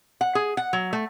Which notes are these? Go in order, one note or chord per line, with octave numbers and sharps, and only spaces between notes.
F#5
G#4
F#5
F#3
A3